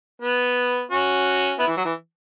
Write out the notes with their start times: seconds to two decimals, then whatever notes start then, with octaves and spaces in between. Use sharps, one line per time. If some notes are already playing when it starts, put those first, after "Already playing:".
0.22 B3
0.91 C#4 F#4
1.59 B3 E4
1.67 E3
1.77 F#3
1.85 E3